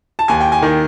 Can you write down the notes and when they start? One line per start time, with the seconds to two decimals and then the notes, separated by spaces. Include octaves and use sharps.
0.19 A5
0.28 D#2 G#5
0.41 G5
0.52 G#5
0.62 D#3